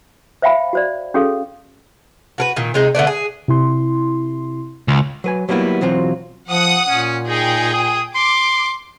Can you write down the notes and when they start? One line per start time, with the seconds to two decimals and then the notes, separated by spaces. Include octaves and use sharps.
0.42 C5 E5 F5 G5 B5
0.73 F#4 C5 D5
1.14 C#4 F#4 G#4 A4 F5
2.38 F#4 A#4 B4
2.56 A#2 D#3
2.74 C3 G#3 D#4
2.95 D3 A3 B3 D4
3.07 G#4
3.48 C3 E4 C6
4.88 C#2
5.24 F#3 B4 G#5
5.49 F#3 G3 A#3 B3 E4
5.81 B1 E3 F#3 C4 F4
6.49 F3 F#5 D#6
6.89 A#2 C#4
7.27 D#4 G#4 G5
7.74 D#6
8.15 C6 D6